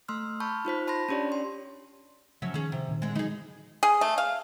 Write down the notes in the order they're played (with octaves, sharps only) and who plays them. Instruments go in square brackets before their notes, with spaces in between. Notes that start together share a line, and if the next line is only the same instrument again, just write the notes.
[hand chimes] A3 C6 E6 F6
A5 B5 C#6 F6 G6
D#4 F4 C5 B6
A5 B5 C6 A#6
C#4 D4 G4 C#5 D5
C6
[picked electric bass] C#3 F3 [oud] F#3 C#4 E5
[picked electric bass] D#3 F3 [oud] C#4 G#4
[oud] C3
[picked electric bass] A#2 D#3
[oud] D3 G#3
[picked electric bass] D3 F#3 G#3 [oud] D#4 G#4
[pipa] G#4
A3
F5